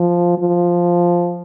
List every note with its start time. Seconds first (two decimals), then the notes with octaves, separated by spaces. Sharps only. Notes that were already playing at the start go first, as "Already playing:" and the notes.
Already playing: F3
0.39 F3